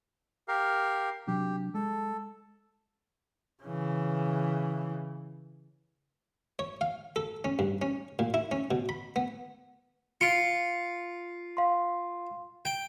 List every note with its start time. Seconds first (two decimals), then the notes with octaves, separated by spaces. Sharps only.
0.48 G4 A#4 F5
1.27 C3 F#3 D4 G4
1.74 G#3 A4
3.63 C#3 E3
6.59 C#5
6.81 F5
7.16 A4
7.44 C#4
7.59 G2
7.82 C#4
8.19 A#2
8.34 E4
8.52 C#4
8.71 B2
8.89 B5
9.16 B3
10.21 F4 C#7 D7
11.57 F5 C6
12.65 G5